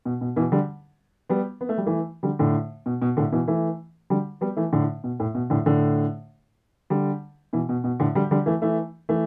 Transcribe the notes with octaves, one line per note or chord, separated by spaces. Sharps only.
B2
B2
B2 E3
D3 G3
G3 B3
B3
A3
G3
E3 A3
D3 G3
A2 D3
B2
B2
A2 D3
B2 E3
E3 A3
D3 G3
G3 B3
E3 A3
A2 D3
B2
A2
B2
A2 D3
A2 D3
D3 G3
B2 E3
B2
B2
A2 D3
D3 G3
D3 G3
E3 A3
E3 A3
E3 A3